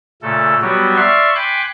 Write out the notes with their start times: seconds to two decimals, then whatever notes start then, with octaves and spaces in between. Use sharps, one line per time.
0.22 A#2 C#3 A3 A4
0.62 F#3 G3 B3 F#4 G4 C#5
0.96 D5 E5 F5 C6 C#6
1.35 G5 G#5 B5 C6 D6 F#6